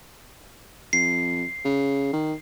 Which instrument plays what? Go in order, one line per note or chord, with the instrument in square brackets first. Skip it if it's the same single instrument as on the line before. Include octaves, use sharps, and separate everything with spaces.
[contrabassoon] F2 [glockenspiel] C7
[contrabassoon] C#3
D#3